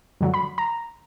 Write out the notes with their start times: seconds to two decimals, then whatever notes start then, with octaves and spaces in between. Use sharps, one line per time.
0.21 F#2 D3 F#3
0.34 B5
0.58 A#5